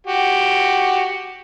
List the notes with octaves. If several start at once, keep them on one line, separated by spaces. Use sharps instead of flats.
F#4 G4